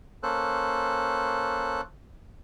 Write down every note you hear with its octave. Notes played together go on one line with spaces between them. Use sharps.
A#3 C#4 A4 C5 F#6